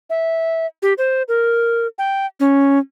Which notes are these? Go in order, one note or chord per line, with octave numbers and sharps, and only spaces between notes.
E5
G4
C5
A#4
G5
C#4